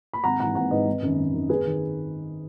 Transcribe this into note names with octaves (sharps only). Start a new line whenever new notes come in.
B5
G#1 F#5 A#5
G#2 E3 F#5 A#5
G#1 F#5 A#5
G#2 E3 B4 D#5
G#1
F#2 D#3
G#1
F#2 D#3
G#1 G#4 B4
D#3